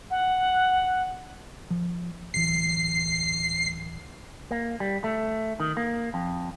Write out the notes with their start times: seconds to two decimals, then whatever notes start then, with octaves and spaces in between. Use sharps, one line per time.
0.10 F#5
1.71 F3
2.34 D1 E3 C7
4.51 A#3
4.80 G3
5.04 A3
5.60 D#3
5.77 A#3
6.14 F2